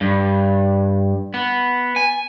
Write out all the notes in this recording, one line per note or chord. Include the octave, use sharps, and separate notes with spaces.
G2
B3
G#5